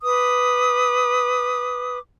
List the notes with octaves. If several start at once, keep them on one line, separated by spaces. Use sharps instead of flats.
B4 D6 D#6